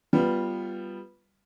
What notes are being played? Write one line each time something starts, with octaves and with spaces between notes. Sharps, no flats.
G3 B3 F4